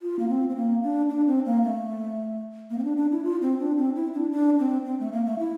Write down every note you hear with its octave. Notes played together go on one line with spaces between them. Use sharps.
F4
A#3
C4
C4
A#3
D4
D4
C4
A#3
A3
A#3
C4
D4
D4
E4
F4
C4
D4
C4
E4
D4
D4
C4
C4
A3
A#3
A3
E4